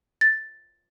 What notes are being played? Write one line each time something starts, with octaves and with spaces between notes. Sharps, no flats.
A6